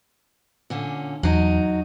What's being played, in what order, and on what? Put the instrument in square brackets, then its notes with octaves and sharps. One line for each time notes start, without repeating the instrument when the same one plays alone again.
[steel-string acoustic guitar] A#2 D3 C#4
[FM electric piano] E2 [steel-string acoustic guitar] F#3 D#4